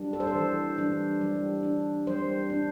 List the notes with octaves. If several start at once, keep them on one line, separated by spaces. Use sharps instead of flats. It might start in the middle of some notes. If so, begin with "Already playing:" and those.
Already playing: G3 D4
A4
C5
A4
E3
G3 D4
G3
D4
G3 C5
D4